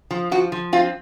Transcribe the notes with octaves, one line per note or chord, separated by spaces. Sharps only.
F3
F3 F#4
F3
C4 F4